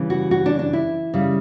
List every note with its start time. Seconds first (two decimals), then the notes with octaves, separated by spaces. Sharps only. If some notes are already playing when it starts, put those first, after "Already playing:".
Already playing: C#3 E3 G3
0.10 F#4
0.31 F#4
0.46 D4
0.59 D4
0.73 E4
1.14 C#3 G3